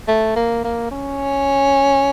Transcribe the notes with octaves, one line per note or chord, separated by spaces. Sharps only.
A3
A#3
A#3
C#4